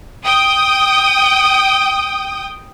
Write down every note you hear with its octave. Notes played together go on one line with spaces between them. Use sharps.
G5 D#6